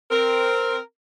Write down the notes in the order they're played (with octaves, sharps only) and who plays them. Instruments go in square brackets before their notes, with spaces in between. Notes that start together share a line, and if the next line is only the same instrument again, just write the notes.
[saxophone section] C4 A#4